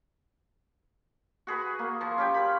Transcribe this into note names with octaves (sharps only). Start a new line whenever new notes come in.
F#4 G#4 B4
A#3
F3
C#4 G4 G5
B5